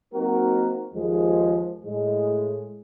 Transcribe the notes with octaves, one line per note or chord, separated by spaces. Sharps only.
F#3 A#3 C4 D#4 F#4 A#4
D#2 F3 G#3
A2 G#3